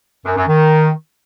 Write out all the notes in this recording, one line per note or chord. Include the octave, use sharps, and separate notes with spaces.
F#2
F#2
D#3